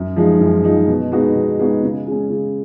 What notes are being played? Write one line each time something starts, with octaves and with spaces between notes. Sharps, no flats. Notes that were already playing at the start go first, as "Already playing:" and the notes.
Already playing: F#2
F3 G#3 D#4
F#2
F3 G#3 D#4
B2
G#3 B3 D#4 F#4
B2
G#3 B3 D#4 F#4
C#3
G#3 C#4
C#3